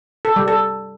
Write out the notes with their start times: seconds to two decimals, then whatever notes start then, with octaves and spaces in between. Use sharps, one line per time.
0.25 A4
0.36 G3
0.48 A4